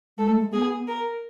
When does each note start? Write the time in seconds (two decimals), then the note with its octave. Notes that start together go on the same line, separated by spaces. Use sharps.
0.18 G#3 A4
0.29 A3
0.40 G#3
0.53 B3 G#4
0.88 A#4